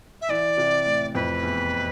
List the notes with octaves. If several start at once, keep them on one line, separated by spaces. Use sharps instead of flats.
E5
E3 D5
C3
A2
F2 B4
E2